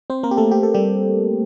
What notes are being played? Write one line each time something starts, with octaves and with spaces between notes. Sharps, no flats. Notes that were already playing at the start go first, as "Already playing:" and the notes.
C4 C5
A#3 A#4
G4
A3 A4
G4
A4
G3 G4